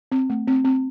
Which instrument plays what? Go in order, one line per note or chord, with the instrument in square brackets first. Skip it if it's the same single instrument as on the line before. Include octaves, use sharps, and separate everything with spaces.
[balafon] C4
A3
C4
C4